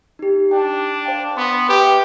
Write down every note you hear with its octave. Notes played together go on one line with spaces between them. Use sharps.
D#4 G4
D4 G5
C5 F5 G5
B3 C6
G4 B4 E5